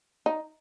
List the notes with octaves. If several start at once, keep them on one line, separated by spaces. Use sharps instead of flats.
D#4